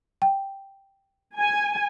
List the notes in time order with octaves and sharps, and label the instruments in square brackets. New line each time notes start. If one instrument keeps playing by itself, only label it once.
[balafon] G5
[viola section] G#5